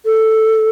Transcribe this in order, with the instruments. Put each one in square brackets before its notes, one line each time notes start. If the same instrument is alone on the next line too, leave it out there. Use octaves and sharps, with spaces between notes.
[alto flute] A4